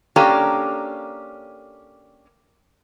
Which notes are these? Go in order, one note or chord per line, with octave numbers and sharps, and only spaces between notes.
A#3 C#4 D4 G4 A4 A#5